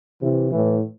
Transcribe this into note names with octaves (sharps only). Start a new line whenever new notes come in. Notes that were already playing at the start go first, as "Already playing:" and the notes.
C3 E3
A2 E3